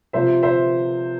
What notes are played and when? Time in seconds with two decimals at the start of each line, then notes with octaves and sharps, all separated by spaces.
0.13 C3 F3 C5 E5
0.43 C5 E5